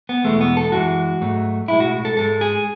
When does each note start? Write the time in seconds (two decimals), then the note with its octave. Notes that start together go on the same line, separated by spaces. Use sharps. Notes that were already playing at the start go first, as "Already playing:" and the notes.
0.09 B3
0.24 E2 B2 G#3 A3
0.41 B3
0.57 A4
0.72 F#2 E3 G#3 F#4
1.21 G#2 F#3 A3
1.68 B1 A2 G#3 E4
1.80 F#4
2.05 A4
2.16 G#2 G#3 A4
2.41 G#4